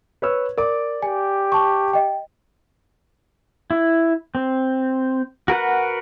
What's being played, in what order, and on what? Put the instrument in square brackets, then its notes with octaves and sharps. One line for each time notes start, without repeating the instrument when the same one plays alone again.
[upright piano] B4 C#5 E6
[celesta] A#4 [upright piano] D5 D6
[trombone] G4 [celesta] G#5
[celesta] A5 C#6
D#5 G5
[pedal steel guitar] E4
C4
F#4 A#4 B4 F#5